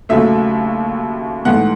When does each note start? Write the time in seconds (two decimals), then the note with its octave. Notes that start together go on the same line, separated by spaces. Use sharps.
0.09 D#2 C#3 F#3 A3 E5
1.45 G#2 E3 A3 F#5